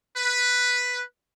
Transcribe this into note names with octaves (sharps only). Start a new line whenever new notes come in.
B4